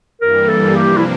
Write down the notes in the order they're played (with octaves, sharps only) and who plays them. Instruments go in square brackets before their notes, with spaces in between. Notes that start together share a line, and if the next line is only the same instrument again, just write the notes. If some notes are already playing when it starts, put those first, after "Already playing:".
[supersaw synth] G2 E3 G3 A#3 [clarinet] A#4
[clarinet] A4
[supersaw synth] C3 F3 A#3 D4 [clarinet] G4
[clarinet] E4